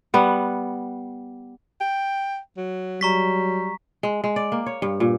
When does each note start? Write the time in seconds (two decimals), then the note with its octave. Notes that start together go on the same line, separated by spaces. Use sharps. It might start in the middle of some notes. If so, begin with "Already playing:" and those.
0.14 G3 B3 F#5
1.80 G5
2.57 F#3
3.01 F#3 G3 A#5 C#6 B6
4.03 G#3
4.24 G#3
4.36 D5
4.52 A#3
4.66 C#5
4.82 G2
5.00 A#2